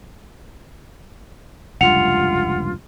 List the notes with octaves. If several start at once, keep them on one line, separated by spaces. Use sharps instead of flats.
F1 C#2 G2 F4 F#5 C#7 F7